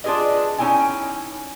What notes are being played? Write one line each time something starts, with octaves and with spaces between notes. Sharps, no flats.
D4 F4 G#4 B4 D#5
C#4 D#4 E4 G5 G#5